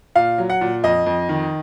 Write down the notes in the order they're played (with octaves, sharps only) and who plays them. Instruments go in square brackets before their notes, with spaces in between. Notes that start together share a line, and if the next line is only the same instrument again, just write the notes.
[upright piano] A#2 F5
F#3
F#5
A#2
F2 D#5
F2
D#3